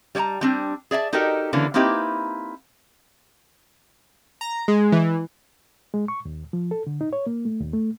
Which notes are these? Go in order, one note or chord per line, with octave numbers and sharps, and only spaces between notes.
G3 C#5 D5 A5 A#5
G3 C4 D4
G#4 D5 E5 A5
D#4 F#4 G4 A4 A#4 D#5
D3 E3 A#3 C#4 D4
A#3 C4 D#4 E4 G4 B4
A#5
G#3
E3
G#3
C#6
D#2
F3
A4
D3
D#4
C#5
A#3
A3
D#2
A3